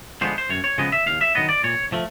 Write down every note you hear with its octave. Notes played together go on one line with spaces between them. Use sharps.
D3 F3 G#3 B3 C5
C5
F#2 C#5
C#5
C#3 F3 G#3 B3 D#5
E5
D#2 F5
E5
D#3 F#3 B3 D#5
D5
A#2 C#5
F3 A3